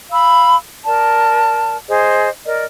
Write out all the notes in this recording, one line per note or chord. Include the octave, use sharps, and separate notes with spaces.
F5 B5 E6
A#4 D5 A5
G#4 C5 D#5
A#4 D5 D#5